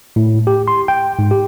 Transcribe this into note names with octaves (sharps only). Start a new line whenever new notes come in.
A2
G4
C6
G5
G#2
G4